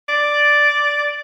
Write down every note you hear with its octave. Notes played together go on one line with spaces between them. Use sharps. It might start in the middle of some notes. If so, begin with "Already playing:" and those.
D5